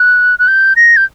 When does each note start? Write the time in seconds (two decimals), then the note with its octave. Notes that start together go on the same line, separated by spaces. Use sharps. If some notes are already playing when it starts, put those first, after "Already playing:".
Already playing: F#6
0.39 F#6
0.48 G6
0.76 A#6
0.97 G6